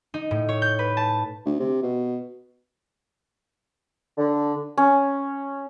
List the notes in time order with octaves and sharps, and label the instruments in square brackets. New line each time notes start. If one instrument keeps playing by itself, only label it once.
[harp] D#4
A2
C#5
G6
B4
A5
[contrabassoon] D2
C3
B2
[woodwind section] D3
[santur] C#4